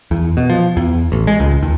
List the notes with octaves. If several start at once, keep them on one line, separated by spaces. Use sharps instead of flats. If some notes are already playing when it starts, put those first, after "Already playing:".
E2
B2
F3
E2
A1
G#3
C#2
D#2